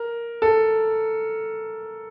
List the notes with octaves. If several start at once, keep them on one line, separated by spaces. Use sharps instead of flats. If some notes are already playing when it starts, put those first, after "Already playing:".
Already playing: A#4
A4